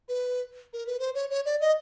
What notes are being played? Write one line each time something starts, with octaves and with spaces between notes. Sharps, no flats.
B4
A#4
B4
C5
C#5
C#5
D5
D#5